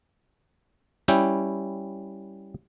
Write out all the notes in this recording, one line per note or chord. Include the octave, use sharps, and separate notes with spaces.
G3 C#4 E4 G5